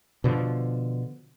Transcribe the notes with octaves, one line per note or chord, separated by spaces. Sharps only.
B2 D3 F3